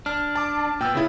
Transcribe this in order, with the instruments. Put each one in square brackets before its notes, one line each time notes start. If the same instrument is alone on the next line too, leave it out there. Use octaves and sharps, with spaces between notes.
[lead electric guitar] D4 [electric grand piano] F6
[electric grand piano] A5 D6
[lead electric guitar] A#2 B3 [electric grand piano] G5 E6
[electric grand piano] C#3 E4